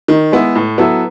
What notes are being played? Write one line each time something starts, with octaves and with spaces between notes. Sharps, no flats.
D#3
G#3 B3 E4
A2
F#3 B3 E4 A4